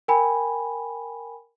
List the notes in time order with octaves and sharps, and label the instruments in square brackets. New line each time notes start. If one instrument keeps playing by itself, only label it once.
[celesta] A#4 G5 G#5 B5